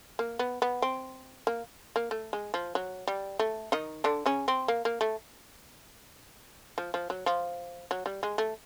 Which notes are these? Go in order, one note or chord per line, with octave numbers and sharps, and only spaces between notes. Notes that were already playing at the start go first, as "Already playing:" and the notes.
A#3
B3
B3
C4
A#3
A#3
A3
G#3
F3
F#3
G3
A3
D#3 D#4
D3 D4
C#3 C#4
C4
A#3
A#3
A3
F3
F3
F#3
F3
F#3
G3
G#3
A3